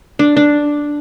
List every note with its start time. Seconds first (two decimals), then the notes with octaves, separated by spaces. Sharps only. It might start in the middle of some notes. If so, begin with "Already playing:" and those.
0.19 D4
0.37 D4